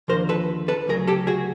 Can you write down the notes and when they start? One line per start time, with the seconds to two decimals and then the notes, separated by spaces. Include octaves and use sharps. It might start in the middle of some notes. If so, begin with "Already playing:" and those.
0.08 D#2 D3 F3 A#4 C5
0.29 A4 B4
0.68 A4 B4
0.87 D2 C#3 F#3 G#4 A#4
1.07 G4 A4
1.27 F#4 G#4